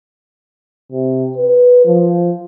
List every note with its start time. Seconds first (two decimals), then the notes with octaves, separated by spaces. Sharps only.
0.92 C3
1.37 B4
1.85 F3